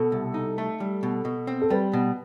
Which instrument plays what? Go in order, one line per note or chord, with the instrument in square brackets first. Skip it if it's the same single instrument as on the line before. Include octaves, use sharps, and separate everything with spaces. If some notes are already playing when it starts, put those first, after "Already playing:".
Already playing: [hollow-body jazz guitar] B2 [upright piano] A4
[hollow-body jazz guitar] C2
D#4
A3
G3
B2
B2
C4
[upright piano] A4
[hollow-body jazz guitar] G3 [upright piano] B4
[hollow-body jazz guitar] B2